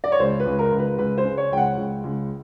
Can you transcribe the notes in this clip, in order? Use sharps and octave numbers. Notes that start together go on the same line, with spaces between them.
D5
C#5
C#2 C5
B4
C#2
A#4
C#2
B4
C#2 B4
C5
C#3
C#5
C#2 G5
F#5
C#2
C#2